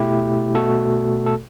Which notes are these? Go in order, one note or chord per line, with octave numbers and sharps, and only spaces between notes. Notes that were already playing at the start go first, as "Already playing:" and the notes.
Already playing: B2 A3 E4 G4
B2 A3 F#4 A4
A4